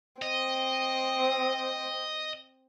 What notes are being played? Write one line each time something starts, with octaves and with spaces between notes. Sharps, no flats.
C4 D#5